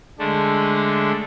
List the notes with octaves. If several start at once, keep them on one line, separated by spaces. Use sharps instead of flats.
D3 G#3 A3 D4